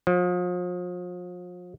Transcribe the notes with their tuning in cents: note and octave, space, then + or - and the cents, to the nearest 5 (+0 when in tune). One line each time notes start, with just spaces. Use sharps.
F3 +40